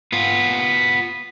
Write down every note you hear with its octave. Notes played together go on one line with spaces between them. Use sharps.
B3 F4